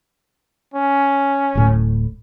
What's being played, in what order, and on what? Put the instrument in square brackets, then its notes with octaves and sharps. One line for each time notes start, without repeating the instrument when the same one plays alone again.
[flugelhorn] C#4
[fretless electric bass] D1 A2